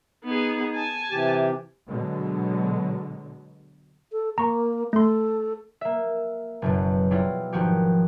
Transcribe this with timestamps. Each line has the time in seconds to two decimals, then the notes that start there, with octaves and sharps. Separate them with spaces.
0.24 B3 D#4 G#4
0.75 G#5 A5
1.11 C3 E3 G4
1.88 B2 D3 F#3 G#3
4.12 A4
4.38 A#3 A#5 C#6
4.93 A3 A4 C6
5.81 A#3 E5
6.62 F#1 F#2 B2
7.11 F#3 G3 E4 F4
7.53 G#1 F3 F#4 G4